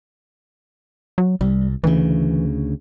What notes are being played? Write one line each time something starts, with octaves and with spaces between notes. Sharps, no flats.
F#3
C2 G3
D2 C#3 E3